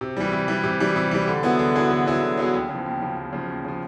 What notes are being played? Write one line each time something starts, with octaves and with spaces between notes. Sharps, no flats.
C3
E3 G3
C3
E3 G3
C3
E3 G3
C3
E3 G3
D3
F#3 B3 E4 G#4
D3
F#3 B3 E4 G#4
D3
F#3 B3 E4 G#4
D3
F#3 B3 E4 G#4
D#2
C#3 F3
D#2
C#3 F3
D#2
C#3 F3
D#2
C#3 F3